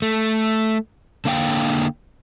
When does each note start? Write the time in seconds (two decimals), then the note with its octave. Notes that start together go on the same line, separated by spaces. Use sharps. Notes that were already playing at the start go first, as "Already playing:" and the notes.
0.02 A3
1.25 D3 A#3 F5 G5